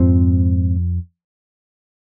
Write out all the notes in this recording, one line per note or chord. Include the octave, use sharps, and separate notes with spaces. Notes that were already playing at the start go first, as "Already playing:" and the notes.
Already playing: F2 G#2 F3 C4